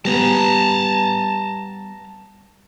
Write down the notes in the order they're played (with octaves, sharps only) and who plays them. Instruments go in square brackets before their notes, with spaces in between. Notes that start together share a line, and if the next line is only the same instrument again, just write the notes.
[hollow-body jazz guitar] G3 B3 [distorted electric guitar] A5 A#5